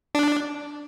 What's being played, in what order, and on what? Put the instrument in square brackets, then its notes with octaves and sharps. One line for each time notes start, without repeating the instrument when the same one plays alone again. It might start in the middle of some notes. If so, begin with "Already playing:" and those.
[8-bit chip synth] D4